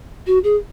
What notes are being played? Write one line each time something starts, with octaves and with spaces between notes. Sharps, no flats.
F#4
G#4